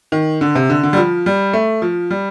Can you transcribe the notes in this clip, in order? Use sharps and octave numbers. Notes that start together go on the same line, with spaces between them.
D#3
D3
C3
D3
D3
G3
F3
G3
A3
F3
G3